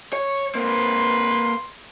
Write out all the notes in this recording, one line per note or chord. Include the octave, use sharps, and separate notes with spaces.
C#5
A#3 C4 B4 C6